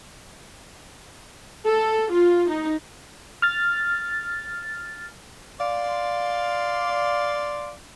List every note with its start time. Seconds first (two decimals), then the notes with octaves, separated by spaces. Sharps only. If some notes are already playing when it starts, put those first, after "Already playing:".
1.65 A4
2.12 F4
2.49 D#4
3.42 F6 A6
5.59 D5 F5 C6